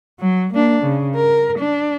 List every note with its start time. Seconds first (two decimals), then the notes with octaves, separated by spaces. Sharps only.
0.20 F#3
0.54 A#3 D4
0.83 C#3
1.16 A#4
1.60 D4